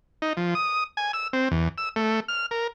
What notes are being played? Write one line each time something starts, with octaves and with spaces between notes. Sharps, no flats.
D#4
F3
D#6
G#5
E6
C4
E2
E6
A3
F6
A#4